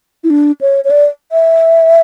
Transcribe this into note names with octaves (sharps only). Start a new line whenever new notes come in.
E4
D4
C#5
C#5
D5
E5